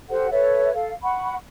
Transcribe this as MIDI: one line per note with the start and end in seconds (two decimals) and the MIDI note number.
0.09 0.29 67
0.09 0.29 69
0.09 0.29 72
0.09 0.29 78
0.31 0.72 69
0.31 0.72 71
0.31 0.72 73
0.31 0.72 76
0.73 0.92 69
0.73 0.92 77
1.02 1.35 78
1.02 1.35 83
1.02 1.35 85